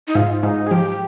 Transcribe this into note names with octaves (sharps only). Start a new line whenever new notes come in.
D#4
G#2 F4
G#2 D#4
G#4
F3 G4